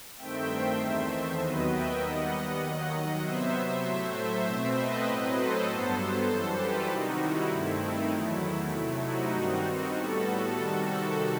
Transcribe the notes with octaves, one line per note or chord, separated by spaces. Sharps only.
G2 D#3 A3 C4 E5 G5
C5 E5
E2 D#3 A3 C4
D#2 D#3 F#3 B3 B4 D#5
E5 G5
D#2 D#3 G3 B3 D#5 F#5
D#2 D#3 F#3
C3 F#3 B3 C5 E5
A2 F#3 A3
C5 E5
B2 A3 C4
B4 D#5
A2 F#3 C4
A4 C5
G2 F#3 B3
F#2 E3 G3
G4 B4
C3 D#3 G3 D#4 F#4
E4
G2 D#3 A3 C4
D#4
E2 D#3 F#3 A3 E4
C3 F#3 A3
D#4 F#4
G2 D#3 G3 C4 D#4 F#4
D#4 F#4
A2 G3 B3 F#4 A4
F#4 A4
C3 D#3 G3
F#4 A4